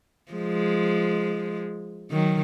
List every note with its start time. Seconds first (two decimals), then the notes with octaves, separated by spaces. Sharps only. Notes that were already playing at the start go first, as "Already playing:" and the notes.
0.32 F3 G#3
2.11 D#3 F#3